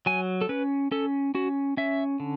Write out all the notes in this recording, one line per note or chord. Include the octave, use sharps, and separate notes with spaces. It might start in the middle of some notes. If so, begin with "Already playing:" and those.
F#3 G#5
A4
C#4 B4
C#4 A4
C#4 F#4
C#4 E5
D3